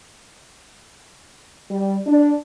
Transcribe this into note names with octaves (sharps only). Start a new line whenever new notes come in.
G3
D4